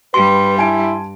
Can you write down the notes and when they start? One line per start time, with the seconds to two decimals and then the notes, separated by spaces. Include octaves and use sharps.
0.14 G2 G3 B4 C6
0.58 E4 G#5 A5 D7